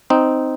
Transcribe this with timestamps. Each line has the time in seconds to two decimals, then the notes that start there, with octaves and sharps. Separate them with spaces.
0.10 C4 D#4